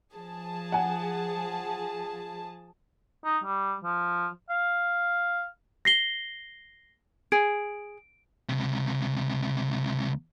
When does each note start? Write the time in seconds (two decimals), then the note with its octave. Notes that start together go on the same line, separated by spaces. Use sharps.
0.14 F3 G#4 A5
0.72 F#5 G#5
3.25 D#4
3.44 G3
3.84 F3
4.50 F5
5.85 A#6 C7 G7
7.32 G#4 D7
8.49 C#2 C3